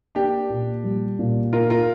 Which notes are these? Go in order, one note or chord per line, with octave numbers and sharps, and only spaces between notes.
A#3 D4 G4
A#2
G3
A#2
A#3 F4 A#4
F4 A#4